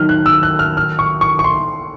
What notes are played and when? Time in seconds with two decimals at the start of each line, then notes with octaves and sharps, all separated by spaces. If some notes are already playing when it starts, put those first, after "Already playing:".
Already playing: D#2 D#3 F#3 F6
0.09 F#6
0.26 E6
0.43 F#6
0.59 F6
0.77 F6
0.99 C#6
1.21 C#6
1.39 C#6
1.44 C6